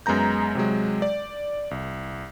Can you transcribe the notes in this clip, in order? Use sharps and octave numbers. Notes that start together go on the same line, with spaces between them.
F#2 G#3 B3 A#5 G6
C3 F#3 G#3
D5
C2